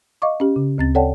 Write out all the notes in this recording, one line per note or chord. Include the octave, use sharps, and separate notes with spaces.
D#5 F5 C#6 D6
C#4 G4
C#3
D2 C4 A6
A4 C#5 D5 F#5 G5 A5